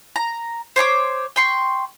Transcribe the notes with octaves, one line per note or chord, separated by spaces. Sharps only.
A#5
C5 C#5 C#6 D6
G5 C6 C#6